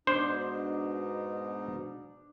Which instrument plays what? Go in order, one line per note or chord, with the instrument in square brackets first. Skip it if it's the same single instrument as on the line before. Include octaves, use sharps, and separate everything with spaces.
[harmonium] G#2 B2 D#4 [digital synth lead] D4 [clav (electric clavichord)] C5